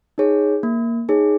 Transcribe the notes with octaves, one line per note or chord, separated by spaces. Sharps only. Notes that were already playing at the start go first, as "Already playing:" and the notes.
D#4 G#4 C#5
A#3
D#4 G#4 C#5